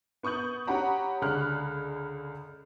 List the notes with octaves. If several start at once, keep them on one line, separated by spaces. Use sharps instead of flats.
B3 C#6 D#6 G6 F#7
C#4 G4 F#5 A#5 B5
C#2 D3 B5 F6 F#6